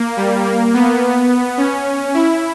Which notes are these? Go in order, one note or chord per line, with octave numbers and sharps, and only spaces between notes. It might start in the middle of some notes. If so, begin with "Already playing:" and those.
Already playing: A#3
G3
A#3
B3
C#4
E4